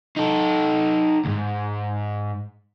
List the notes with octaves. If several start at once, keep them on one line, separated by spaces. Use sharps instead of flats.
D#4 A4
D2 G#2